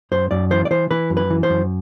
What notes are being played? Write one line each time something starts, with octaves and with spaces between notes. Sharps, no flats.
F#2 C5
F#2 D5
E3 C5
D5
E3 C5
E3 B4
F#2
B4
E3
C5
F#2